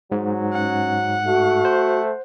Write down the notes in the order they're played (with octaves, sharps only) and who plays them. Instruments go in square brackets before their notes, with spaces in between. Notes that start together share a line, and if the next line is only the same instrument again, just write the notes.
[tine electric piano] G#2 [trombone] F#3
[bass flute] C#4 [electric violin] F#5
[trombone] A3 [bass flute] F#4
[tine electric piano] C5